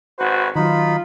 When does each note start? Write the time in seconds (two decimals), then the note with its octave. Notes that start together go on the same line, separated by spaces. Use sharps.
0.19 G#1 F#4 B4 C5
0.55 D#3 F#3 D#4 F4 B5